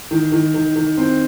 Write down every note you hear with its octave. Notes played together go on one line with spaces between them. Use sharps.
D#3
D#3
D#3
D#3
C4